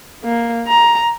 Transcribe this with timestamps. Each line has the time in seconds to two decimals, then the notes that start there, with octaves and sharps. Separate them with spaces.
0.24 A#3
0.67 A#5